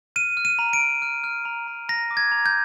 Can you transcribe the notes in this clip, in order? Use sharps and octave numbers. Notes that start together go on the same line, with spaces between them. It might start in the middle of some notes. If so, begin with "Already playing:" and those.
F6 D#7
F6
D#7
A#5
D7
A#5
F6
F6
A#5
A#5
A#5 A#6
D6
G#6
A#5
G6